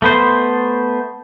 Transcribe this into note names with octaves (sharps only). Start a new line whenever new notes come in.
A3 B3 C5